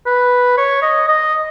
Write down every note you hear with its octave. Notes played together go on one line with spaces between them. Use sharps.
B4
C#5
D#5
D#5